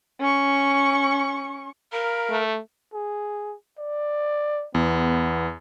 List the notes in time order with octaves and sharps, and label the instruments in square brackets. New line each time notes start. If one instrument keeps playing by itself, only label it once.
[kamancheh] C#4 C#6
[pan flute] A#4 [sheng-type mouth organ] F5 A#5 B5
[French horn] A3
[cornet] G#4
D5
[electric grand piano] E2 [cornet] B3